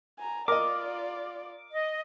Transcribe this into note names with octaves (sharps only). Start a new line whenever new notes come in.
G#5 A#5
F4 A#4 D5 D#5 D6
D#5